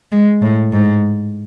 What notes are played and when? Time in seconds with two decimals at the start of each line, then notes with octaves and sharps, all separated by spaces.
0.12 G#3
0.42 A2
0.72 G#2